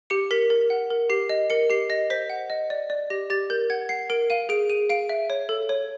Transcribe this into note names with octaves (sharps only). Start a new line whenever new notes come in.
G4 C#7
A#4 B6
A#4
F#5
A#4
G4 C7
D#5
A#4 C#7
G4 C7
D#5 A#6
C5 B6
F#5
D#5
D5
D5
G4 A#6
G4 A6
A#4 G6
F#5 G#6
F#5 C7
A#4 D7
F5 D#7
G#4 D7
G#4 D#7
F5 D7
E5
C#5
A4
C#5